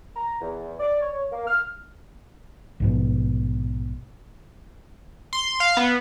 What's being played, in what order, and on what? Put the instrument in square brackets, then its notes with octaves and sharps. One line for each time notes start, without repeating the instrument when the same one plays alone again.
[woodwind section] A#5
E2
D5
C#5
A#3
F6
[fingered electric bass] A#1 G#2 B2
[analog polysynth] C6
F5
B3